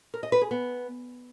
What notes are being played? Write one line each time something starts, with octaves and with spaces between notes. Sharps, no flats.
A#4
D#5
B4
G#4
B3